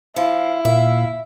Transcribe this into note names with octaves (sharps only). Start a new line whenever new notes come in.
F3 E4 F5
A#2 E5 F5